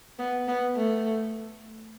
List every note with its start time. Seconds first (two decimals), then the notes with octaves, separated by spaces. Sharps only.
0.19 B3
0.48 B3
0.76 A3